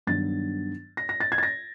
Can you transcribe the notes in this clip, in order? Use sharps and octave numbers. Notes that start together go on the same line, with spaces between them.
G2 D#3 F#3 B3 D4 A6
A#6
A#6
A6
G#6
A6
A#6